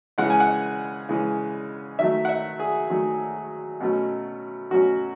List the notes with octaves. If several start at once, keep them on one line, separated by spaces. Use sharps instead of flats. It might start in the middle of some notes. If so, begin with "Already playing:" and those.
C#3 E3 G#3 C#4 F#5
G#5
F#5
C#3 E3 G#3 C#4
D#3 F#3 A3 E5
F#5
E5
G#4
D#3 F#3 A3
B2 F#3 A3 C#4
B2 F#3 A3 C#4 F#4